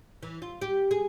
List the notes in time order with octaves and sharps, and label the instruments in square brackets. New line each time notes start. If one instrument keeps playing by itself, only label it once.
[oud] E3
F4
G4
G#4